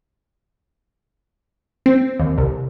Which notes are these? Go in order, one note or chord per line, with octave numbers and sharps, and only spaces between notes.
C4
D#2
C2